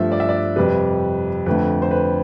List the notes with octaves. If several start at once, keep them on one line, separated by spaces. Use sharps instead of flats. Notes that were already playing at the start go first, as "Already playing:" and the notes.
Already playing: G2 F3 A3 E5
D5
E5
D5
F2 C3 G3 B4
F2 D3 A3 B4
C5
B4